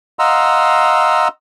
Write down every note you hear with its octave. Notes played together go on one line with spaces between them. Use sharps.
D#5 F5 F#5 A#5 C6 E6